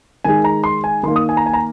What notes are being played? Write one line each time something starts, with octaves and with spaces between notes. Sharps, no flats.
D#3 G#3 G#5
A#5
C6
G#5
D#3 A#3 C6
D#6
G#5
A#5
G#5
A#5